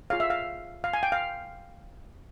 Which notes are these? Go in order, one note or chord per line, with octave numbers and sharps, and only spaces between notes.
F4 G#4 C#5 F5
E5
F5
F5
G#5
G5
F5